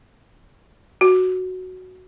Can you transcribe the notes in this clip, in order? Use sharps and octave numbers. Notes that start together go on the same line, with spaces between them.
F#4